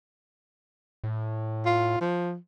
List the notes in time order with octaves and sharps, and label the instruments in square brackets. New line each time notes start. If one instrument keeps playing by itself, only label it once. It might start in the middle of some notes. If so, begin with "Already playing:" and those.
[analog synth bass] A2
[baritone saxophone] F4
F3